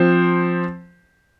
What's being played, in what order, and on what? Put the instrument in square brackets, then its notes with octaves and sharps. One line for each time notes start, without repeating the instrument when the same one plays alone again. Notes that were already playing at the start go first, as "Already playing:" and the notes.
Already playing: [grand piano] F3 C4 C5